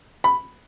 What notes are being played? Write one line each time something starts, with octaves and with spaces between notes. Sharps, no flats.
B5